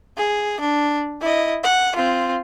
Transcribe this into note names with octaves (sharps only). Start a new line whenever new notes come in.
G#4
D4
E4 D#5
F#5
C4 F4